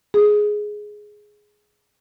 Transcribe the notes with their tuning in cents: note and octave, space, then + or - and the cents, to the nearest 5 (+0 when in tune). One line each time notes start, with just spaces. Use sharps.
G#4 +5